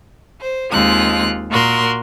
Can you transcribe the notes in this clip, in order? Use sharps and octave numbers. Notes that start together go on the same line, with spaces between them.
C5
D#2 G#3 C4 F4 F#6
A#2 F#4 A#4 C6